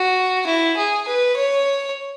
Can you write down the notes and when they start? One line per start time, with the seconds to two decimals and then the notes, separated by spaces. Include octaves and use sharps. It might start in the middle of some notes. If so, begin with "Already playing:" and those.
Already playing: F#4
0.46 E4
0.77 G#4
1.07 B4
1.36 C#5